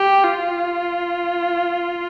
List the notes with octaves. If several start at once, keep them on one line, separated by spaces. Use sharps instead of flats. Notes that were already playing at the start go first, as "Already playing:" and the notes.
Already playing: G4
F4